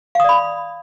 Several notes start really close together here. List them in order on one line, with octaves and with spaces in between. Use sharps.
F5 D#6 D5 B5